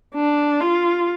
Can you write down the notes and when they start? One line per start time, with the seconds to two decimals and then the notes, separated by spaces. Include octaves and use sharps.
0.15 D4
0.61 F4